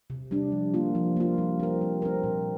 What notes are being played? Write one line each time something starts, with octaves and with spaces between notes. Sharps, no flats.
C3
G3 D4
F3
A#3 F4
F3
A#3 F4
G3
C4 A#4
G3
C4 A#4
A#2